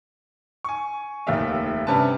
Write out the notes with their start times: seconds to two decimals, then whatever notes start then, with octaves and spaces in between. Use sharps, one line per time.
0.64 G#5 C#6
1.27 F1 D#2 D#3 E5 F5
1.87 G2 C3 C#4 B4 A5